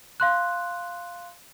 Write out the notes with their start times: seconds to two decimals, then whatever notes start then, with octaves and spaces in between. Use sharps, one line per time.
0.20 F5 C6 F#6